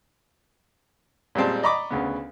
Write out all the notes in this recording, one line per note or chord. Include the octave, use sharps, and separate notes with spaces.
A#2 G3 G#3 C4 A5
D5 D#5 A#5 B5 C#6 D6
D2 C#3 B3